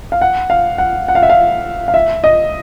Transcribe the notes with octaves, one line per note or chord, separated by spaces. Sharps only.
F5
F#5
F5
F#5
F#5
F5
E5
F5
F5
E5
D#5